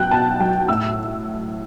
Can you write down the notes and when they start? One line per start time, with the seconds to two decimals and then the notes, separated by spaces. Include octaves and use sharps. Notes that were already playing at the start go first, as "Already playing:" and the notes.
Already playing: B2 F#3 G5 F#6
0.11 B2 A5
0.40 F#3 G5
0.68 A2 E6